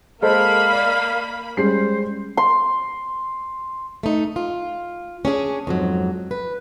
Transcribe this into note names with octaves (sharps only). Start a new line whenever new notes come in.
G#3 A#3 A4 C5 F5 B5
D5
G3 G#3 C#4 C5 C7
C6
A3 D#4
F4
C#4 D4 G#4
F2 G#2 F#3
B4